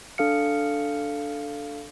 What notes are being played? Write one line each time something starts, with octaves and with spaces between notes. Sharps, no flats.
D4 A4 F5 F6 C#7